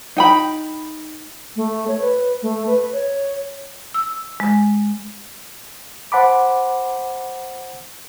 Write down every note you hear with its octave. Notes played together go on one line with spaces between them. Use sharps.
D#4 G5 B5
A3
C#5
B4
A3
B4
C#5
E6
G#3
C5 F#5 A5 B5 D6